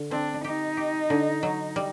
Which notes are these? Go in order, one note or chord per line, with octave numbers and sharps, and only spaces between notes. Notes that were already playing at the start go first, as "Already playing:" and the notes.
Already playing: D3
C4 D4
D#4 G4
G4
D3
F#3
G3